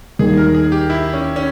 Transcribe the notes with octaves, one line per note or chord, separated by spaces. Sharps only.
D#2 D#3 G3 G#4
A#4
G#4
G4
E4
C#4
C#4